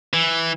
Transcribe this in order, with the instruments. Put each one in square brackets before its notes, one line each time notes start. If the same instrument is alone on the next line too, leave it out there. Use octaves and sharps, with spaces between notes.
[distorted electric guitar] E3